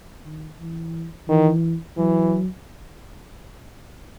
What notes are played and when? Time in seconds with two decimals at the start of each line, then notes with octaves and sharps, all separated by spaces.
0.25 D#3
0.60 E3
1.28 D#3 E3
1.97 E3 F#3